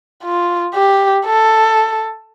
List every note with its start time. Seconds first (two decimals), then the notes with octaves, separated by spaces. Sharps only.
0.23 F4
0.74 G4
1.25 A4